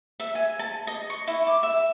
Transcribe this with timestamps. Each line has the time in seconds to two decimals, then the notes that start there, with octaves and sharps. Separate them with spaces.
0.20 E5
0.35 G#5
0.59 A5
0.87 D#5
1.10 C#6
1.27 E4
1.47 D6
1.63 E5